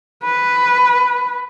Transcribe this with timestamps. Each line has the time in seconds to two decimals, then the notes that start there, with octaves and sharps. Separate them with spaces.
0.24 B4